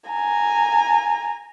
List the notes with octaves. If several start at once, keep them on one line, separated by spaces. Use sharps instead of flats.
G#5 A#5